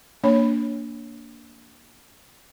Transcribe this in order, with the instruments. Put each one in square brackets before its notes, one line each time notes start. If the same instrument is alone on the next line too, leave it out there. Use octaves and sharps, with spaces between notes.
[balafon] A#3 D4 C#5 B5